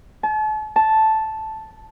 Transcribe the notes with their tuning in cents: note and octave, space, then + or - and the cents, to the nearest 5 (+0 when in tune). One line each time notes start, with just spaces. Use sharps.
A5 -40
A5 -5